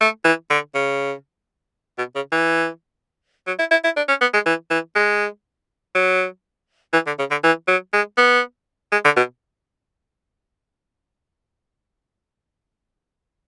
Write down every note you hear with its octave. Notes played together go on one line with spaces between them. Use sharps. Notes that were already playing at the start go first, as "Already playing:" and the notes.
A3
E3
D3
C#3
B2
C#3
E3
F#3
E4
E4
E4
D4
C#4
B3
G#3
E3
E3
G#3
F#3
E3
D3
C#3
D3
E3
F#3
G#3
B3
G#3
D3
B2